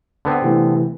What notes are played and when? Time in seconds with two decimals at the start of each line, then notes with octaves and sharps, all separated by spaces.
0.25 D3 B3 C4
0.42 C3 E3 A3